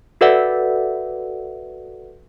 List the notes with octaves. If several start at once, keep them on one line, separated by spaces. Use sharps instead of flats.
F#4 A4 B4 D5 E5 F#5